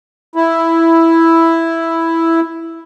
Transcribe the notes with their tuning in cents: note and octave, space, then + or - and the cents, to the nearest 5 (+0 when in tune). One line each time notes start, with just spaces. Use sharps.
E4 +0